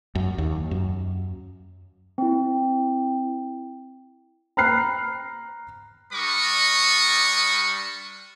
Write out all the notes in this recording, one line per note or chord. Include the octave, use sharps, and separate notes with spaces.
F#2
D#2
F#2
C4 E4
A#5 B5 F6 F#6 C7
G3 D4 A#4 B5 C#6 D#6